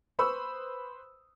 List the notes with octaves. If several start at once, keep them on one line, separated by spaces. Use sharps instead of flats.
B4 C5 B5 C#6 D#6 E6